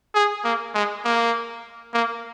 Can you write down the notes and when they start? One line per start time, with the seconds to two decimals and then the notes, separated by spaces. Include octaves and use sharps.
0.15 G#4
0.44 A#3
0.74 G#3
1.05 A#3
1.94 A#3